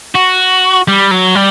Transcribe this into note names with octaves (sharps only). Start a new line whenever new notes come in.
F#4
G3
F#3
G3